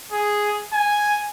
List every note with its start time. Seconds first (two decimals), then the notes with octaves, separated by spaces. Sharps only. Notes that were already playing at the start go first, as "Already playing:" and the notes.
0.12 G#4
0.73 G#5